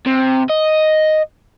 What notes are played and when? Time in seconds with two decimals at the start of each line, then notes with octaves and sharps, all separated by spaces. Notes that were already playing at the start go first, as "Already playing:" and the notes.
0.06 C3
0.49 D#5